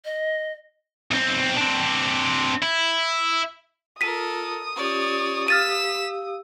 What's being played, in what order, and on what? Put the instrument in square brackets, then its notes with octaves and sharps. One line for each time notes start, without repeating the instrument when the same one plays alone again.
[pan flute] D#5
[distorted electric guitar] B1 C4
C4 D4
E4
[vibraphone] F4 [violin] A4 A#4 [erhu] D#6 [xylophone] B6 D#7
[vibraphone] C#4 F4 G4 [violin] C#5 D5
[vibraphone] G4 F5 E6 [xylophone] F6 A6 D#7 [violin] B6 E7